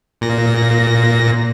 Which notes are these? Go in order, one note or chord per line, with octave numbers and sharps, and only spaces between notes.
A#2 A#6